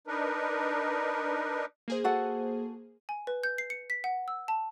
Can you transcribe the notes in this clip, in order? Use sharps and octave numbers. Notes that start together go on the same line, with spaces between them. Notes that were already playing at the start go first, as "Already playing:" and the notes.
D4 D#4 A#4 B4
A#3 G#4 C5
F#4 A4 F#5
G#5
B4
G6
C7
C#7
B6
F#5
E6
A5